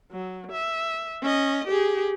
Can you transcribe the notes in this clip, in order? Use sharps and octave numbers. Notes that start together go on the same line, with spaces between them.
F#3
E5
C#4 D#5
G4 G#4